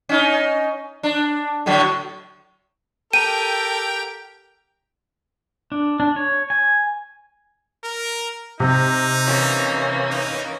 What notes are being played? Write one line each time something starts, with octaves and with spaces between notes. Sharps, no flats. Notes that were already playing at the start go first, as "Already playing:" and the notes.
C#4 D#4
D4
A2 D3 F#3
G4 A4 A#4 G5 D#7
D4
D4
C#5
G#5
A#4
C3 D#4
E3 A#3 C#4
D#4